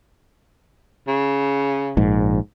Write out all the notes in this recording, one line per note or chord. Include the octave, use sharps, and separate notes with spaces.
C#3
A#1 G#2